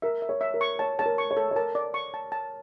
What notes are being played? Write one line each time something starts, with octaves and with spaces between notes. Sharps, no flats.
A#4 E5
E5
C#5
E5
A#4
C#6
C#5 A5
C#5 A5
A#4
C#6
C#5
A4
C#5
A#4 A5
D5
C#6
A5
A5